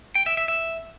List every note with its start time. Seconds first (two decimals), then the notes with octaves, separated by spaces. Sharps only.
0.15 G5
0.26 E5
0.37 E5
0.48 E5